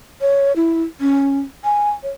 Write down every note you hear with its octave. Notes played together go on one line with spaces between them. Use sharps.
C#5
E4
C#4
G#5
C#5